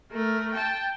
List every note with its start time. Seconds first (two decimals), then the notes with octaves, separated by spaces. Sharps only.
0.12 A3 A#4
0.53 G5 A5